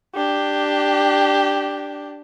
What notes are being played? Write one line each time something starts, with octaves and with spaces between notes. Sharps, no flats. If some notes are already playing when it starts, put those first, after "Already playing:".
D4 G4